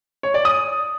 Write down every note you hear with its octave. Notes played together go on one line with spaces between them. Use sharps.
C#5
D5
D#6